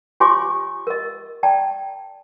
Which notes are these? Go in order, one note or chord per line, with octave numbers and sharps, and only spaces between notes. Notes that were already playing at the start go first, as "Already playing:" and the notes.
F4 G4 C#5 G#5 C6 D6
A#4 D#5
D5 G5 A5 A#5